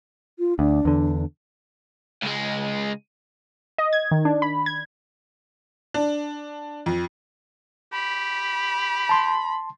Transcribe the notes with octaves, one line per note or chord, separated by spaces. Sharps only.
F4
D2 D4
E2 D3
C#2 G#3
D#5
G#6
D#3
D4
B5
G#6
D4
F2
G4 B5
A5 C6